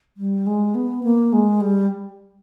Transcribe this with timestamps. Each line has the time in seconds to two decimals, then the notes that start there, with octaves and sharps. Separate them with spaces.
0.17 G3
0.47 G#3
0.75 B3
1.03 A#3
1.33 G#3
1.61 G3